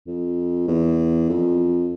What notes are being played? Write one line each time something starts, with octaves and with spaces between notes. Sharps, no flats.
F2
E2
F2